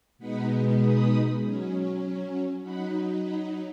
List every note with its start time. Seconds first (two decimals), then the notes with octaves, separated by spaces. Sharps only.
0.18 B2 G#3 B3 D#4 F#5 B5
0.79 B5 D#6
1.41 F#3 C#4
2.62 F#3 D#4 F#5 B5
3.23 F#5 B5